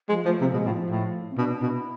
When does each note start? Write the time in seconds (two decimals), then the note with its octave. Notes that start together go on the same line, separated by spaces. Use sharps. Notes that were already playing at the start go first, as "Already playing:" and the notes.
0.09 F3 G#3
0.25 F3 A3
0.41 C3 F3
0.53 B2 G#3
0.66 A2 F3
0.90 A2
1.31 C4
1.38 B2 D4
1.55 D4
1.61 B2 E4